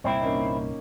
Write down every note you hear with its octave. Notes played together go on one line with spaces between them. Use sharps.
C2 G2 A#2 C4 E4 G5 C#6
A#3 C#4 D#4